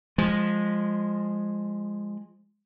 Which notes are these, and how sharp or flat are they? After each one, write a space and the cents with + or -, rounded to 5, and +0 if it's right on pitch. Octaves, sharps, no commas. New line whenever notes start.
F3 +5 G#3 -10